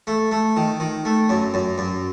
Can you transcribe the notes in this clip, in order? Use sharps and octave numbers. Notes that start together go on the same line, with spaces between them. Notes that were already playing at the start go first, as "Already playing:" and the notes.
A3
A3
D#3
D#3
A3
F#2
F#2
F#2